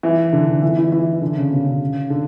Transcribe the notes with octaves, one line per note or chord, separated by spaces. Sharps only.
E3
D3
D3
E3
E3
E3
E3
D3
C#3
B2
C#3
D3